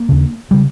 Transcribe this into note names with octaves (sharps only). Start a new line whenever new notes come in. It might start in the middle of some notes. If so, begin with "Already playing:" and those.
Already playing: A#3
D#2 C#3
C#3 G3